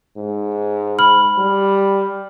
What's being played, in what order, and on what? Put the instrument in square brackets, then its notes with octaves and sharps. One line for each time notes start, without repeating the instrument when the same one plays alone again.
[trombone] G#2
[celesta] B5 F6 F#7
[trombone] G3